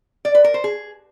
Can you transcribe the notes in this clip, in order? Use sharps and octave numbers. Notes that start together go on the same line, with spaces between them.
D5
B4
A#4
C5
G#4